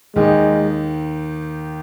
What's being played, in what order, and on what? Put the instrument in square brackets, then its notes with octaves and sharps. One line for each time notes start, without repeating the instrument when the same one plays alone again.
[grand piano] D#2 D#3 [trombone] G#3